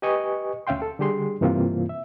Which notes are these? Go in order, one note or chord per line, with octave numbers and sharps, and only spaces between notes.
G4 B4 D#5 G#5 C#6
D2 C#4 E5 F5 G5 C6
A4
D3 G3 G4 G#4 C6
G2 C3 E3 A#3 C4 F4
E5